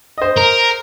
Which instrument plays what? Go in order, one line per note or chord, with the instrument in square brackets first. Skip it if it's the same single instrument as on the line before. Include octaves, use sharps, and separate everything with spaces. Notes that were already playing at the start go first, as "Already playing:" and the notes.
[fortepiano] C5 D#5
[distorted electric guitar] A#4